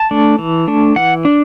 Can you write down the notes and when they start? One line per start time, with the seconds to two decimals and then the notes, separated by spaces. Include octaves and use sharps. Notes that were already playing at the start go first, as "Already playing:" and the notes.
Already playing: A5
0.11 A3 D4
0.39 E3
0.68 A3 D4
0.96 E3 F#5
1.25 D4